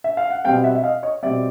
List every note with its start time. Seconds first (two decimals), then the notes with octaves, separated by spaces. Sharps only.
0.04 E5
0.17 F5
0.30 F#5
0.44 B2 G3 C4 F5 G5
0.64 E5 F#5
0.76 E5
0.84 D#5 F5
1.03 C#5 D#5
1.23 B2 G3 C4 D5 E5